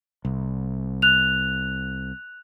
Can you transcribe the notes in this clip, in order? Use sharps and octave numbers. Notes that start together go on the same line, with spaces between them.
C2
F#6 F7